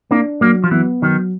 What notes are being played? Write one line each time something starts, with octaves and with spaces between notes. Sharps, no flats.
A#3 D4
F#3 A#3
F3
E3 B3
D#3 F#3